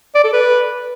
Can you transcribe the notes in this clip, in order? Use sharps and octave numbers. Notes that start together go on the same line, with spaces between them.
D5
A4
B4